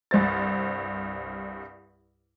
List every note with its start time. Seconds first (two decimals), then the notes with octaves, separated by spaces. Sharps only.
0.11 C2 G2 C5 A6